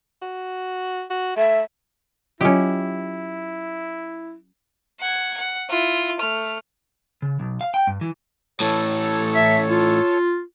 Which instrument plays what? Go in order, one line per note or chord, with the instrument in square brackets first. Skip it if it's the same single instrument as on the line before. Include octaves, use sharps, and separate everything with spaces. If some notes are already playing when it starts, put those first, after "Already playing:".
[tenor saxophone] F#4
F#4
[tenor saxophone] A3 [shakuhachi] E5
[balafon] F#3 F4 [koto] C#4 G4 [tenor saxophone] E4
[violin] F#5 G#6
F#5
E4 F4
A3 F6
[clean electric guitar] C#3
B1
F5
G5
G2
E3
[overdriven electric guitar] A2 E3 [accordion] A4 C#5 A5
[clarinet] E5
F4